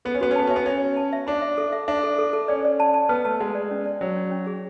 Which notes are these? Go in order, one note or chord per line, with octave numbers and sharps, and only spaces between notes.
B3 A4
C#4
B3 F#4
C#4
B3 A5
C#4 E5
B3
C#4 E5
F#4
A5
E5
D4 B5
E5
A4
E5
D4 E5
A4
A4
A4
C#4 D5
D5
A5
A5
B3 B4
A3 A5
G#3 F#5
D5
C#4
D5
F#3 C#4
C#4
C#4
G#4